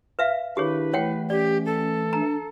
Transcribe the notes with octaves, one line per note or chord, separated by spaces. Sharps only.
B4 E5 F5
D#3 D4 E4 G4 G#4 B4 C#5
E3 A3 C#5 F#5 G5
C#4 G4 D5
A4
D4 A#5